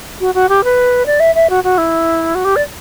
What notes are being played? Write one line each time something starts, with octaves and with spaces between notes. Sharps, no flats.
F#4
F#4
G4
B4
D5
E5
E5
F#4
F#4
E4
F#4
G4
D5